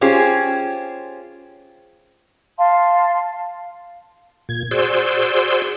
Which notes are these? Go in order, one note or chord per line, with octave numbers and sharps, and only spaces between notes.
C#4 F4 G4 G#4 C5
F5 A5 C6
A#2 G#6
F#4 G#4 C5 D5 C6 E6